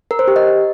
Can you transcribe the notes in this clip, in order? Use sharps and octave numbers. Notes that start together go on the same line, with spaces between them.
A#4
C5
G4
D#5